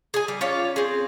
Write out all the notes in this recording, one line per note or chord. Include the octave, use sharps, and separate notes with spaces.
G#4 G#5
G3
C#4 F4 C#5 D5
C4 G#4